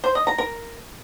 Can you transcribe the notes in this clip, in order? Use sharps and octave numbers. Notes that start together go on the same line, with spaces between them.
C5
D#5
A#5
A#4